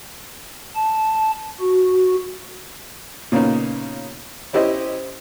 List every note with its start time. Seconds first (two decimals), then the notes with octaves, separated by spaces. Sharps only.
0.75 A5
1.60 F#4
3.32 A#2 C#3 A#3 B3 C#4 D#4
4.53 C#4 E4 G4 C5 D#5